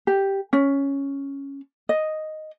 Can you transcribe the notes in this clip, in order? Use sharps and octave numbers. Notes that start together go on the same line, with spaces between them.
G4
C#4
D#5